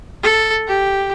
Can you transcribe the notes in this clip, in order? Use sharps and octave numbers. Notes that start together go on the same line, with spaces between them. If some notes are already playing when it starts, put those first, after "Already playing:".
A4
G4